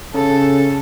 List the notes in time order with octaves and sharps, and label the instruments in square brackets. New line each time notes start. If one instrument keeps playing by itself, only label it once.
[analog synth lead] C#3 [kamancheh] A4